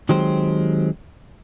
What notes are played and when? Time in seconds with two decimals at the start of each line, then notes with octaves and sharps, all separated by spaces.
0.09 D#3 F#3 G#3 C4 G4 C5